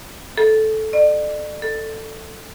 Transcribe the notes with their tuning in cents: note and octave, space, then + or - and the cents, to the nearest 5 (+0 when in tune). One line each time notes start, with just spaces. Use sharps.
A4 -10
D5 +40
A4 +10